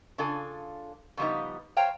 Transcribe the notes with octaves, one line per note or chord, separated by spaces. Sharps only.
C#3 D4 F4 A4 G#5
C#3 F3 G3 B3 D#4
C5 C#5 F5 G5 A#5